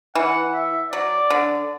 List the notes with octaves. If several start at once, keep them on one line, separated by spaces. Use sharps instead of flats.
E3 F#5
E5
F#3 D5
D3